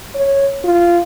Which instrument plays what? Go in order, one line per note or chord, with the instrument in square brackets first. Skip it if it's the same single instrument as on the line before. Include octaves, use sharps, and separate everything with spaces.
[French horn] C#5
F4